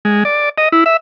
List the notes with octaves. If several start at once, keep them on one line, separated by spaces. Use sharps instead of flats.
G#3
D5
D#5
E4
E5